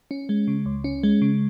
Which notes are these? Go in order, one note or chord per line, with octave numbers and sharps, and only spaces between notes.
C#4
G#3
C#3
C#2
C#4
G#3
C#3